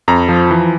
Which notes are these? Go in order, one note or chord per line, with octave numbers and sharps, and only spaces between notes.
F2 A#5
F3
E3